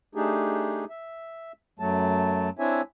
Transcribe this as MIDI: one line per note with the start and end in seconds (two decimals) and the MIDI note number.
0.15 0.85 57
0.15 0.85 62
0.15 0.85 63
0.15 0.85 67
0.15 0.85 68
0.90 1.52 76
1.79 2.49 42
1.79 2.49 54
1.79 2.49 57
1.79 2.49 81
2.59 2.81 60
2.59 2.81 62
2.59 2.81 64
2.59 2.81 73
2.59 2.81 76
2.59 2.81 80